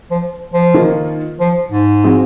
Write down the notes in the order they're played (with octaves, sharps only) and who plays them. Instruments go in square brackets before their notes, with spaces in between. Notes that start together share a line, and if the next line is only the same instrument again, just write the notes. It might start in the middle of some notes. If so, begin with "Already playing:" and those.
[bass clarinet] F3
F3
[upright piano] D#3 A#3 F4
[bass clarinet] F3
G#2
[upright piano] F#3 C4 F4 G#4